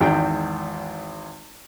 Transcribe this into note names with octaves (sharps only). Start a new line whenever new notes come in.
G#1 E2 G#2 D#4 G5